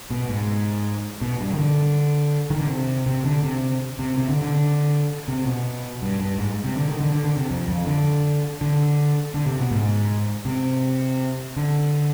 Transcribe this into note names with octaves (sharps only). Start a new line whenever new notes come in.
B2
G#2
B2
G2
D#3
D3
D#3
D3
C3
C3
D3
C3
C3
C3
D3
D3
C3
B2
G2
G2
G#2
C3
D3
D#3
D3
D3
D3
C3
F2
F2
D3
D3
D3
C3
B2
G#2
C3
D3